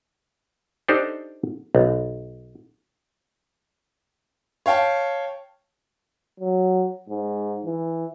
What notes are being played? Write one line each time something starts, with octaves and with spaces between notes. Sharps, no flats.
D4 D#4 G4 A4 C5 D5
B1
C#5 F5 G5 A5
F#3
G#2
E3